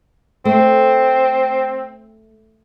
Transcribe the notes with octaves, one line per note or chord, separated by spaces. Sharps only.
A3 C4